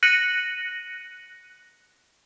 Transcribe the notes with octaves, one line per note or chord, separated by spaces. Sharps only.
F#6 A#6 C#7 D#7 F#7